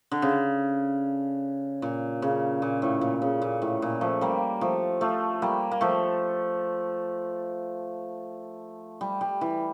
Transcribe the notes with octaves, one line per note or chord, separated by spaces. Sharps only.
D3
C#3
A#2
C#3
A#2
A2
A#2
C#3
A#2
A2
A#2
F3 A3
G3 A#3
F3 A3
F3 A3
G3 A#3
A#3
F3 A3
G3
G3
E3